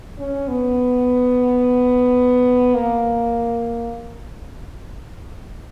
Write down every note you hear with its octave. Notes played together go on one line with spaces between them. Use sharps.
C#4
B3
A#3